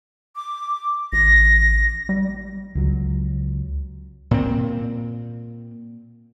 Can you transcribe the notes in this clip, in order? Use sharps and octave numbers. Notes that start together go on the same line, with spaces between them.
D6
A1 A#6
G3
C#2 F#3
A#2 C4